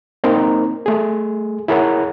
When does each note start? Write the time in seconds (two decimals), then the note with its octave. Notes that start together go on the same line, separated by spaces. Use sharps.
0.24 A#3 C4 D#4 A#4
0.86 A3 G#4
1.68 E4 G#4 A#4 C#5 F#5